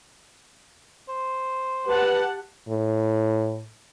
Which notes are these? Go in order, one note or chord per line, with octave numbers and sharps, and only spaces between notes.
C5
G4 B4 F#5 A5
A2